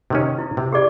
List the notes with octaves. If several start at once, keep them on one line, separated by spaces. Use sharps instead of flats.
C3 D#3 C#4
E4
C3
G4 G#4 D5